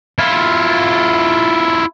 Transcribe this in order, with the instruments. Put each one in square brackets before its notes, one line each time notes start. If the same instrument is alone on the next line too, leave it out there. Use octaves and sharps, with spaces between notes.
[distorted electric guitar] E4 F4